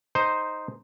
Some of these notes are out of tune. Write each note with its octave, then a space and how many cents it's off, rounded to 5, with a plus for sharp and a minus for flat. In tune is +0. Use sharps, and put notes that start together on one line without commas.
D#4 +0 C5 +0